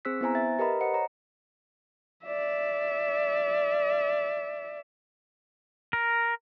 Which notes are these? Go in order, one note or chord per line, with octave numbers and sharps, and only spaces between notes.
C4 G#4 C5 E6 F#6 B6
B3 E4 C5 G#5 A#5
E5 A6
G4 A#4 B4 D#5 A#5 B5
C5 D#5 F#5 C#7
C#5 A#5
D5 E5
A#4